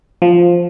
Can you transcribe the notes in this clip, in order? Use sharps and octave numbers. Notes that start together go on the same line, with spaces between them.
F3